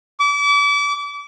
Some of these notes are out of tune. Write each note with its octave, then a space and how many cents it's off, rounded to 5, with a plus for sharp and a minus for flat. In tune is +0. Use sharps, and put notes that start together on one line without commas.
D6 -35